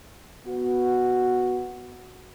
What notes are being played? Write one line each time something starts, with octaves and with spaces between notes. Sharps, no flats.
B3 F#4